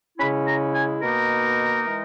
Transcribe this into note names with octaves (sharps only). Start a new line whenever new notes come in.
C#3 G#3 C#4 E4 B5
A#5
G#5
B2 A#3 D#4 A#4
E3 G#3 D#4